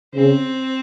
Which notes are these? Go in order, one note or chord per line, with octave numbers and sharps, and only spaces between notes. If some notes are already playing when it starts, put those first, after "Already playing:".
C#3 C4